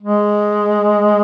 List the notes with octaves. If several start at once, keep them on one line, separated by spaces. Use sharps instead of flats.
G#3